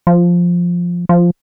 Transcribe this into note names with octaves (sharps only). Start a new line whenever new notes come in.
F3
F3